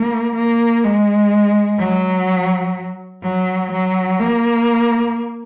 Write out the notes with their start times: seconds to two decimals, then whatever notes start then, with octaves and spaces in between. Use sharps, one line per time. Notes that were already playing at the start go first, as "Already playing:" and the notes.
Already playing: A#3
0.35 A#3
0.84 G#3
1.79 F#3
3.23 F#3
3.72 F#3
4.20 A#3